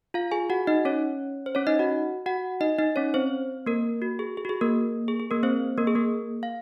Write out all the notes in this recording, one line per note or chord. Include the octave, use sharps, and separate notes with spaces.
F4 F5
G#4 G#5
F#4 F#5
D#4 D#5
C#4 C#5
C5
C#4 C#5
D#4 D#5
F#4 F#5
F#4 F#5
D#4 D#5
D#4 D#5
C#4 C#5
C4 C5
A#3 A#4
F#4
G#4
G#4
F#4
G#4
A#3 A#4
G#4
G#4
A#3 A#4
C4 C5
A#3 A#4
G#4
A#3 A#4
F5